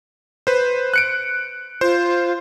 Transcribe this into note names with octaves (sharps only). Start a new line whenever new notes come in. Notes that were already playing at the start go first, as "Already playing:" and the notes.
B4 C5
F#6 C#7 D7
F4 C5